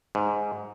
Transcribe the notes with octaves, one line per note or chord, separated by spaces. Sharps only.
G#2